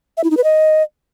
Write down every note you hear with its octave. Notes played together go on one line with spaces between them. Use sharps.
E5
E4
D#4
B4
D#5